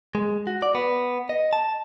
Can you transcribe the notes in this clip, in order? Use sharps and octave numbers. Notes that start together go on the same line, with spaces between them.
G#3
F#4
D5
B3
D#5
A5